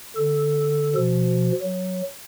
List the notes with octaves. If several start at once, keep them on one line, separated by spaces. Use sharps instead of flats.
D3 A4
B2 F3
F#3